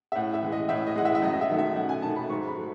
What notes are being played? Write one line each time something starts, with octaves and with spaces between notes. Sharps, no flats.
E5
A2 F#5
E5
E3 G#3
D#5
A2 E5
D#5
G#3 F#5
E3 E5
E5
F#2 D#5
D#5
E5
D#3 F#3 A3
E5
F#2 F#5
G#5
D#3 F#3 A3 A5
B5
G#2 C#6
B5
F#3 A3